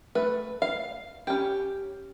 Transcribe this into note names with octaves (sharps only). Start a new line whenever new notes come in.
A3 B4
F5
C#4 G4